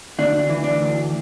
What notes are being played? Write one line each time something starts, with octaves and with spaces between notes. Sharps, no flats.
D2 D4
E3
D4
D2